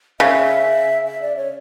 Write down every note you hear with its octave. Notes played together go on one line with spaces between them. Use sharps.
C#3 E5
E5
D5
C#5